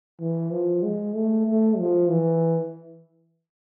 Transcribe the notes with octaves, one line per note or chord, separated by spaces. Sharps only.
E3
F3
G#3
A3
A3
F3
E3